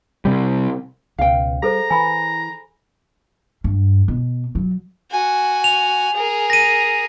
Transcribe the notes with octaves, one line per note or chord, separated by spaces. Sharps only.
C3 G3
C#2 B2 F5 G5
G3 G#4 A4 C5 A#5
E3 G#5 B5
G2
B2
F#3
F#4 G#5
F7
G#4 A#4
A#6 D#7